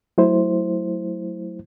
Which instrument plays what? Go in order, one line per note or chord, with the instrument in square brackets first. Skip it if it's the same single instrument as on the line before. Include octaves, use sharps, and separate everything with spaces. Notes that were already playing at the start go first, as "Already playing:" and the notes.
[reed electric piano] F#3 A3 E4 C5